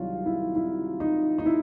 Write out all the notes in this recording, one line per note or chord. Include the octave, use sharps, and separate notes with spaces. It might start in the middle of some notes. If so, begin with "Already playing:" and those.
Already playing: C2 C3 D#3 F#3 D#4 F4 F#4
E4
E4
D#4
D#4
E4